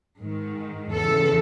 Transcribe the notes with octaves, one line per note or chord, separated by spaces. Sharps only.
G#2 D#3
E2 C#3 E3 A4